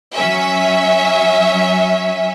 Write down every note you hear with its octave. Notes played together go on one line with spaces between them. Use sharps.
F#3 C#4 E5